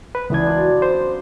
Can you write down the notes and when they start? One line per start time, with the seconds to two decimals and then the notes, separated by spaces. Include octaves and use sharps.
0.15 B4
0.30 C#2 E3 B3 D4 G#6
0.46 F#2 F4 D5
0.82 C5